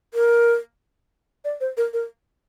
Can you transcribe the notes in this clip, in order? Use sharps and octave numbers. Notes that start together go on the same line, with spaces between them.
A#4
D5
C5
A#4
A#4